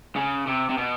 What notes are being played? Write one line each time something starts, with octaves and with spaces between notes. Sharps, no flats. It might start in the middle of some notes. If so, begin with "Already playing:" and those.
C#3
C3
C3
B2